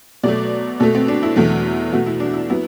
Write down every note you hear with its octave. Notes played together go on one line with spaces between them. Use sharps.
B2 F#3 A3 D5
B2 A3 A4
C4
D4
E4
E2 B2 F#3 A3
B2 A3 F#4
E4
D4
E4
F#3 B3 E4